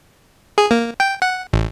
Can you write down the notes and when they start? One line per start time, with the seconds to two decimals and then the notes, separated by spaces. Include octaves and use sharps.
0.58 G#4
0.71 A#3
1.00 G5
1.22 F#5
1.53 A1